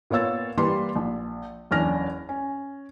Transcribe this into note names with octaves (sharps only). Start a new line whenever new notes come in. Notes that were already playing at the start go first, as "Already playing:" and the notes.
A#2 B3 F4 C#5 E6 A6
E3 G3 A#3 B4 C6
A#1
F#1 E2 C#4 D4 F6 A#6
C#4